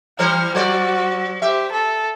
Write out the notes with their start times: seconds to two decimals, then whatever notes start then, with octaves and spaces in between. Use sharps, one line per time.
0.19 E3 G3 C5 F6
0.55 F#3 F#4 C5 D5
1.42 G4 C5 E5
1.72 A4